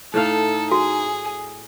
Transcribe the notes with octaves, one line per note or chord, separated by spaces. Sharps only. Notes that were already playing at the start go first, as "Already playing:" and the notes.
A2 A3 D#4 A4 F5
F#4 G#4